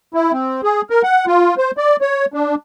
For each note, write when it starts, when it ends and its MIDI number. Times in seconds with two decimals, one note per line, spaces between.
0.14 0.32 64
0.32 0.61 60
0.63 0.82 68
0.90 1.02 70
1.03 1.26 78
1.27 1.55 65
1.58 1.71 72
1.77 1.96 74
2.01 2.25 73
2.34 2.55 62